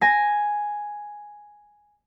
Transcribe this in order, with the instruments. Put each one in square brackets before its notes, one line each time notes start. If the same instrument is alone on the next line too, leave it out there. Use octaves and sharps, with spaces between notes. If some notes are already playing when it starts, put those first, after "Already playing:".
[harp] G#5 A#6